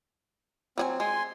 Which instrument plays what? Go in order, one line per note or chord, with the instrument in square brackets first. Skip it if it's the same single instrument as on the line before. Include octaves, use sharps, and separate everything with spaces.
[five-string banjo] F#3 G#4 G#5 [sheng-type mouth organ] C4
[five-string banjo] G#3 [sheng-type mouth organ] G#5 C6